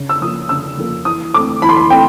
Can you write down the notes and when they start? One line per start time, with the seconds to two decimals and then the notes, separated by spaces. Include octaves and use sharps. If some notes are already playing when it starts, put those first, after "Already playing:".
Already playing: C#3
0.09 E6
0.21 F3 A#3 D#6
0.49 C#3 E6
0.78 F3 A#3
1.05 E3 D#6
1.34 A3 C4 D6
1.62 E3 B5
1.69 C6
1.77 B5
1.90 A3 C4 G5